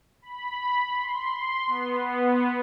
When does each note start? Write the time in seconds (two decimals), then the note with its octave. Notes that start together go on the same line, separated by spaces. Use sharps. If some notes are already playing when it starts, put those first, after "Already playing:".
0.22 B5
0.92 C6
1.67 B3
2.00 B3